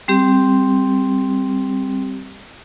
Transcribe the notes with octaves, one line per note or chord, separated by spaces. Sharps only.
G3 C4 G4